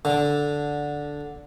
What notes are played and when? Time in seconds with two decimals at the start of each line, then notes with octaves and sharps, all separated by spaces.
0.05 D3